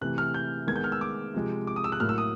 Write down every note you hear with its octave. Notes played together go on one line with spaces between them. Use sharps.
C3 E3 A3 C4 F#6
F6
G6
D#3 G#3 B3 G#6
G6
F6
E6
D6
C3 F3 G#3 C4
D6
D#6
E6
F#6
A2 F#3 A#3 F6
E6
D#6